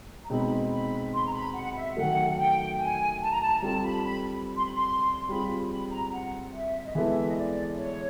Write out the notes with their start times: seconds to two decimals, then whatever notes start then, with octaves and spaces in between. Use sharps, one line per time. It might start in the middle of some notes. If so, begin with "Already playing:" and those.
0.23 A#5
0.30 B2 G#3 C4 D#4 B5
0.72 B5
1.13 C6
1.26 A#5
1.33 B5
1.54 F#5
1.75 E5
1.96 D#3 F#3 A3 F#5
2.29 F#5
2.38 G5
2.79 G#5
3.20 A5
3.31 A#5
3.41 A5
3.58 A#5
3.62 G3 C4 F4 A4 A5
3.83 B5
4.04 B5
4.56 C6
4.64 B5
4.74 C6
5.29 G3 C4 F4 G#4 B5
5.70 B5
5.91 A#5
6.12 F#5
6.53 E5
6.86 D#5
6.94 E3 G#3 B3 E4 A4 E5
7.28 D#5
7.36 D5
7.78 C#5